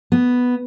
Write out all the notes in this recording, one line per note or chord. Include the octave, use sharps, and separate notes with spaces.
B3